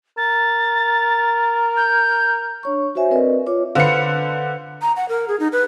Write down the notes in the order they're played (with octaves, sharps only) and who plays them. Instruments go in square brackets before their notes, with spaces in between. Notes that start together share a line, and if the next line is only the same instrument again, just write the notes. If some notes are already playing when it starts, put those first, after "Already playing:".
[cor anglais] A#4 [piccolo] A6
[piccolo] G6
[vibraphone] D4 C#5 C#6
F#4 C5 C#5 E5 G#5
C4 A#4 B4 D5 D#5
F4 C#5 D6
[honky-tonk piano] D3 C#7 [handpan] B4 C5 F5
[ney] A#5
F#5
A#4
G#4
D#4
B4